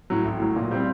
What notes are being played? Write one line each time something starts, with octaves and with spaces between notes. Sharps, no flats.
A2 F#3
A1
A2 F#3
A#2
G3 C4